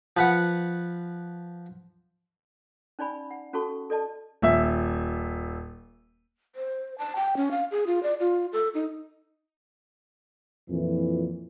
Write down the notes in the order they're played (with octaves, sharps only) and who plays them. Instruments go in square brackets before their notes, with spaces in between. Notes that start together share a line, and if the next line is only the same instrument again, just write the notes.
[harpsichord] F3 B4 F#5
[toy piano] C#4 D#4 D5 G#5 B5
F#5
C#4 F#4 A4 A5 C#6
A4 D5 D#5 A5
[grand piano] D#1 E5
[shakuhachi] C5
A5
G5
C#4
F5
G#4
F4
D5
F4
A4
D#4
[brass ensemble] F2 A#2 E3